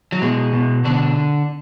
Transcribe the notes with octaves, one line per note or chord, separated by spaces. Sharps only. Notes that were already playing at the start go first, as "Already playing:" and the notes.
F#3
B2 G#3
B2
B2 D3 D4